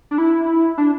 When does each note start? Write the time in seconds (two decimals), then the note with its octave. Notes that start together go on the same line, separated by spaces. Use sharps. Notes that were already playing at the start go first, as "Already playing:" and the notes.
0.11 D4
0.18 E4
0.78 D4